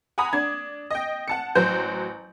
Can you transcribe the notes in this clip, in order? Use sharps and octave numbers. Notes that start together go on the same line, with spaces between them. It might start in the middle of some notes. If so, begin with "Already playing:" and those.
F#5 G#5 A#5 B5 D#6
D4 G#6
D#5 G5
F#5 A5 C#7
A1 F#3 C5 G6